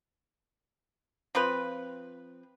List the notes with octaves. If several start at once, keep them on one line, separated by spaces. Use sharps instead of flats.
F3 C4 F4 B4